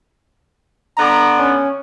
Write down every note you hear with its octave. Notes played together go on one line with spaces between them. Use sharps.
D3 B3 D5 A#5
C#4